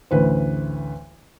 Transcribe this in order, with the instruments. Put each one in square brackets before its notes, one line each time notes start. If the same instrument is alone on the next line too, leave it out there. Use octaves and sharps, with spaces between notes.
[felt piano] A1 D2 B4 C5